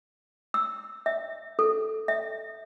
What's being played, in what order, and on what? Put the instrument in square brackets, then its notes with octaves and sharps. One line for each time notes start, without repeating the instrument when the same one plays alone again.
[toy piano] E6
E5
A4
E5